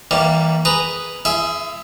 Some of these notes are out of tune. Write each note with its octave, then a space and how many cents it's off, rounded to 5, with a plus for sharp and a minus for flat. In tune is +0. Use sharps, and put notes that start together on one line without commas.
E3 -30 G3 +0 A#3 +0
G#4 -5 B4 +0 A#5 -10
E4 +45 G#4 +10 E5 +0